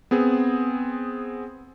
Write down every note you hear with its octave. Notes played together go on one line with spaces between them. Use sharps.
B3 C4 G#4